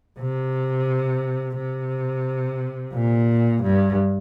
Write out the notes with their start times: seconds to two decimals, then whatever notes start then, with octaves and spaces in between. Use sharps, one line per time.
0.20 C3
1.57 C3
2.94 A#2
3.63 G2